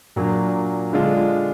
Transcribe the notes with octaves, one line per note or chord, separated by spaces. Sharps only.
A#2 F#3 A#3 D4
D3 G#3 D4 F4